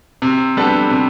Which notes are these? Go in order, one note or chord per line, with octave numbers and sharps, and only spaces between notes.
C3
G3 B3 D4 A4
C3